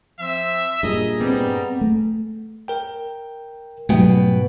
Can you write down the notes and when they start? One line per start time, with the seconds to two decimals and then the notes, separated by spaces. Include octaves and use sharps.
0.19 F3 C4 E5
0.83 G2 A#2 G#4 D#5 A#5
1.20 G3 B3 C4
1.81 A3
2.68 A#4 G5
3.89 G#2 B2 F#3 G3 A3 B4 G5